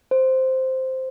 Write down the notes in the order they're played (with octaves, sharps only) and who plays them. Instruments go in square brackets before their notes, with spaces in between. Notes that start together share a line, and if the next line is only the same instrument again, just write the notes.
[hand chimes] C5